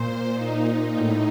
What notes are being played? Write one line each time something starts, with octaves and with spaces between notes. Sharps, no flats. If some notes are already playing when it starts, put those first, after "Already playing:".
Already playing: A#2 C5
D#4
A2